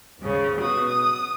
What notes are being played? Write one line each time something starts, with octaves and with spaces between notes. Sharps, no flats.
D#2 G#2 C#3
B2 F#4 D#6
D#6